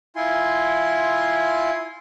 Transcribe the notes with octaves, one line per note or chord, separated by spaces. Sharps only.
E4 F4 G#5 C6